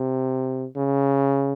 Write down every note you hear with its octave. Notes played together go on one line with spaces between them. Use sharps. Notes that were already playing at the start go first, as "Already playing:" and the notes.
Already playing: C3
C#3